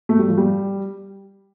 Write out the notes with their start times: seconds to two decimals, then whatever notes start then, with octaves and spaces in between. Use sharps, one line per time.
0.09 A3
0.19 G3
0.29 F3
0.38 G3